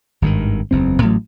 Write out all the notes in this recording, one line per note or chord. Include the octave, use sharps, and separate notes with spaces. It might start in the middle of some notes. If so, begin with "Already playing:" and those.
G#1 G2 D3 D#3
F#1 E2 C4
A1 A2 F#3